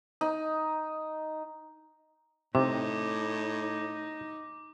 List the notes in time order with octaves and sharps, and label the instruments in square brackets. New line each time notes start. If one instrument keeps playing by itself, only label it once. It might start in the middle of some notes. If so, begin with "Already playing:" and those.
[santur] D#4
[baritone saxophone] A2 [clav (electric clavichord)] C3 [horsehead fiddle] D#4 [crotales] D6